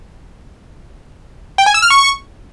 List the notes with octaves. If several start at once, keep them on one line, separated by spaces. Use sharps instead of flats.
G5
G#5
E6
F6
C#6